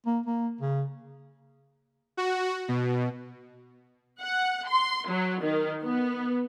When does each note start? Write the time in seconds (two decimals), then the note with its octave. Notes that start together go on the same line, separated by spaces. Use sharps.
0.06 A#3
0.26 A#3
0.61 C#3
2.17 F#4
2.68 B2
4.20 F#5
4.67 C6
5.09 F#3
5.42 D#3
5.83 B3